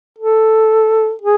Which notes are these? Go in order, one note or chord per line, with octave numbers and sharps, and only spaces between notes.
A4
G#4